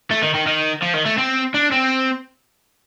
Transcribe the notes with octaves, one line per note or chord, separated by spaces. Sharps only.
A3
D#3
D#3
D#3
F3
D#3
A3
C4
D4
C4